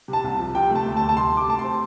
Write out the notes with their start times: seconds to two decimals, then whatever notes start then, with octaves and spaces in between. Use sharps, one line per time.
0.08 C3
0.13 A5
0.24 C2
0.40 F3
0.54 C3 G5
0.71 A3 A5
0.86 D2
0.97 A5
1.01 D2
1.09 A5
1.17 C3 C6
1.33 C3 D6
1.48 A3 A5
1.59 C4 C6